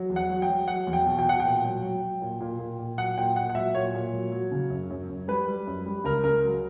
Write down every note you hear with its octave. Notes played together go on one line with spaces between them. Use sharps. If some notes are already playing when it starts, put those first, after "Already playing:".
Already playing: F#3
E2
F#5
F#3
G5
F#3
F#3 F#5
E2
G5
B2
G5
B2 F#5
G5
A#2
F#3
F#3
F#3
A#2
A#2
A#2
A#2
F#3 F#5
A#2 G5
A#2 F#5
F#5
F#3 E5
A#2 C#5
A#2
F#3
F#3
C#3
F#2
F#2
F#2
G3 B4
G3
F#2
G3
C#2 A#4
C#2 A#4
F#3